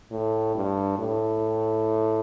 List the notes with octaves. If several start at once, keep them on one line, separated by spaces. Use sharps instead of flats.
A2
G2
A2